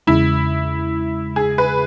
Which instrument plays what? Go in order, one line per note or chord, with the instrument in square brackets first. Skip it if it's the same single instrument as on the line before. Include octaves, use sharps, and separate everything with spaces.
[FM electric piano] E2 C#3 G#3 [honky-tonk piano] E4
[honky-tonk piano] G#4
B4